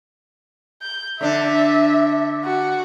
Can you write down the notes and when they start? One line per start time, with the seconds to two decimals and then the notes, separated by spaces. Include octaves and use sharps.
0.82 G6
1.21 D3 D4 E5
2.44 F#4